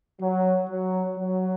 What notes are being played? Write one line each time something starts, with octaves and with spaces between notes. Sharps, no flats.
F#3
F#3
F#3